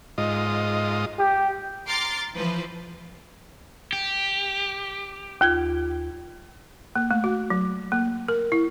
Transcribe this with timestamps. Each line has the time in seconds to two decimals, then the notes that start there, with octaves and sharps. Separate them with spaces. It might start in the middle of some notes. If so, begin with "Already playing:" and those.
0.18 G#2 F4 D#5
1.19 G4
1.88 A#5 C6 D6 F6 A6 C7
2.35 E3 F3 B4 C5
3.93 G4
5.41 D#2 F4 G#6
6.96 A#3
7.11 A3
7.24 F#4
7.50 F#3
7.92 A#3
8.28 A#4
8.52 E4